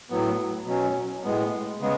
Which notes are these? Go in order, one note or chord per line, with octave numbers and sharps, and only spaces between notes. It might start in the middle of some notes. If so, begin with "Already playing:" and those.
A2 F#3 B3
B2 F#3 C#4
A2 G#3 B3
C#3 G#3 B3